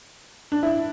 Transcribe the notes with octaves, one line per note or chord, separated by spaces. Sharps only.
D4
E4